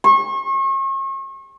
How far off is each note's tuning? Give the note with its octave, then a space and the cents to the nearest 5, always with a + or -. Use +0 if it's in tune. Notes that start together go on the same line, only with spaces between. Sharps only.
C#6 -40